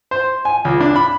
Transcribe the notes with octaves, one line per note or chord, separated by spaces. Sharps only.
C5
G#5
C#2
D4
B5